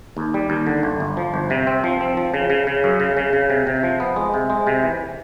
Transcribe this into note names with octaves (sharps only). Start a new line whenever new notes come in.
D#2
G3
D#2
D3
G1
G1
F3
G1
C3
C4
F3
C4
F3
C#3
C#3
C#3
F#2
C#3
C#3
C#3
C3
C3
F3
B3
G#3
C3
G#3
C3
E3